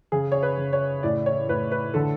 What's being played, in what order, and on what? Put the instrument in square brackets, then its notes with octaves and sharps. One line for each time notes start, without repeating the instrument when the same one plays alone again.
[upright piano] C#3 G#4
C#5
B4
C#3
C#5
A2 D5
C#5
A2 B4
B4
D3 A4